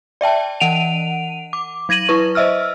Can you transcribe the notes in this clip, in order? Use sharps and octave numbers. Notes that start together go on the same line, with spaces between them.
D5 E5 G5 A5
E3 F#5 D7 D#7 F7
D6
F#3 G#6 A#6 D#7 F#7
E4 B4 C#6
C5 D#5 E5 E6 F6